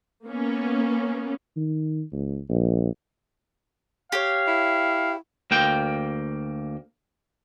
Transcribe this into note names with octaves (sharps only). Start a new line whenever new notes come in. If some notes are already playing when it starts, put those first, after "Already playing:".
A#3 B3 C#4
D#3
C#2
A#1
G4 C#5 F5
E4
D2 A#3 G5